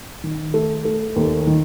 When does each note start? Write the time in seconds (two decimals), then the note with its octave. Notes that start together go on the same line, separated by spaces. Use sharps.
0.24 D#3
0.54 A3
0.85 A3
1.16 D#2
1.47 D#3